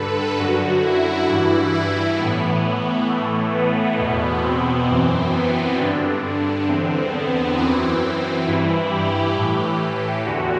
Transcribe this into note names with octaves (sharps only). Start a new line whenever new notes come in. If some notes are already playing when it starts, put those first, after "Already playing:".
Already playing: G2 D3 A4 B4
F#2 D3 F#4
E4
G2 E3
E4
A2 E3 B3
A2 E3 A3
B3
E2 B2
C4
F#2 E3 C4
B3
G2 D3 D4
E2 D3 C4
B3
F#2 E3 C4
G2 E3 E4
G4
A2 E3 G4
E2 D3 F#4